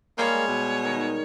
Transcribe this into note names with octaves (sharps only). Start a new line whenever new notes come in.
G3 G#3 A#3 C#5
B2
D#3